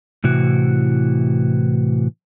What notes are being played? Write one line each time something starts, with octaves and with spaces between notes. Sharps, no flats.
A2 C3 E3 F#4